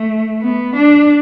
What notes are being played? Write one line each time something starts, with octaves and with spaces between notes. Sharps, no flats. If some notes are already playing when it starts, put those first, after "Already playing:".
Already playing: A3
B3
D4